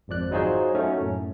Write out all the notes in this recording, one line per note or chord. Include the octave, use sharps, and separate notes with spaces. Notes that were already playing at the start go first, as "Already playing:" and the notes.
G#1 F2 F3 D5 F#6
F#3 D#4 F4 G#4 C5 C#5
A3 C#4 D#4 F#4 A4 C#5
F#2 A2